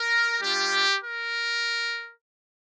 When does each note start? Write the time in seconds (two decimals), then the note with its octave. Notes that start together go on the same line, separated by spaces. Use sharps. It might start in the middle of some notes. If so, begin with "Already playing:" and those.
Already playing: A#4
0.42 G3 D4 F4 G4
1.03 A#4